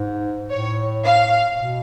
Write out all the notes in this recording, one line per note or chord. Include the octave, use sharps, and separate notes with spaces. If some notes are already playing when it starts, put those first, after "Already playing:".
Already playing: G#2
A2 C#5
F5
B2